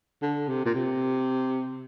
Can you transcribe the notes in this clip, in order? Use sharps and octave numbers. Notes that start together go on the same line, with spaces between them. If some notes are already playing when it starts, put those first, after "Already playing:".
D3
C3
A#2
C3